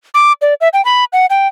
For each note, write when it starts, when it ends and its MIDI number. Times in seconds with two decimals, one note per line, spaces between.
0.14 0.33 86
0.42 0.54 74
0.61 0.69 76
0.73 0.84 79
0.85 1.05 83
1.13 1.26 78
1.30 1.48 79